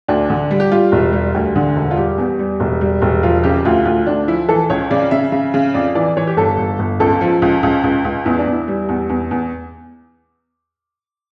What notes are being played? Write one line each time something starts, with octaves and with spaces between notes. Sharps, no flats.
D2 D4
D3
G3
G4
G3 F4
E1
G3
D2
D3
E1
F4
G3 G4
E2
G3
E1
G3
E1
F3 F4
C#3 G4
D2 F4
D2 F4
D2 D4
F3 E4
E3 A4
C#2 C#5
C#3 D5
C#3 E5
C#3
C#3
F2 D5
E3 D5
E3 C#5
G4
G1 A4
G1
G1
C#2 A4
F3
C#2
C#2
C#2
C#2
E2 E4
D4
E2
E4
G3
E2
E2
E2